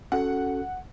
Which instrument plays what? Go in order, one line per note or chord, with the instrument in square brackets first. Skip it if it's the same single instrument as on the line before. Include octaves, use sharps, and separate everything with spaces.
[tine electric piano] C#4 F#4 A4 [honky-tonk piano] F#5